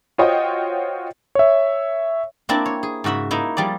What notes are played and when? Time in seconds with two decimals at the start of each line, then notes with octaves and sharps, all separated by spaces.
0.18 F4 F#4 C5 C#5 D#5 G5
1.35 C#5 E5
2.49 A#3 C4 D4 E4 D5 A5
2.66 C#5
2.83 G#4
3.04 G#2 C#3 F#4 E5 B5
3.31 A#3 D#4 E4
3.57 F3 G3 G#4 D5